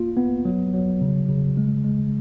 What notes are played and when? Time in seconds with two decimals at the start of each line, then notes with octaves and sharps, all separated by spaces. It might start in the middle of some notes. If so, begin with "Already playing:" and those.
Already playing: A#3 F4
0.17 B3
0.45 F#3
0.74 F#3
1.01 C#3
1.28 C#3
1.57 G#3
1.84 G#3